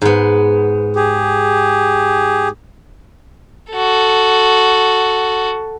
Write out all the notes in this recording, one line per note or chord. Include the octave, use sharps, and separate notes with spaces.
G#2 B3
G4 G#4
F#4 A4